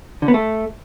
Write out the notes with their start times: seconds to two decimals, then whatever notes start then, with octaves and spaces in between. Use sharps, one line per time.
0.22 D3
0.28 B3
0.34 A3